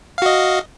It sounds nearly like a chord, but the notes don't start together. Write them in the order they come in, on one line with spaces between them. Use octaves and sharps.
F5 F#4 D#5